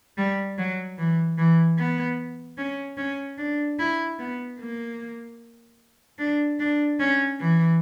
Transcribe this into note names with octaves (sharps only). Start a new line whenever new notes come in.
G3
F#3
E3
E3
B3
C#4
C#4
D4
E4
B3
A#3
D4
D4
C#4
E3